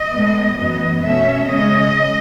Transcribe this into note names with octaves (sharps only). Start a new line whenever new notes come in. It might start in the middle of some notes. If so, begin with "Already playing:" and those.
Already playing: D#5
A2 G#3 B3
F#2 E3 B3 D#5
B2 A3 C#4 E5
C#3 G#3 C#4 D#5